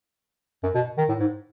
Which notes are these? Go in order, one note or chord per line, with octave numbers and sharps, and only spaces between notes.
F#2
B2
D#3
A2
G#2